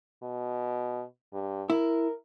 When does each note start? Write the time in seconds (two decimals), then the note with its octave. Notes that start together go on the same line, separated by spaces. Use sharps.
0.23 B2
1.33 G2
1.70 E4 A#4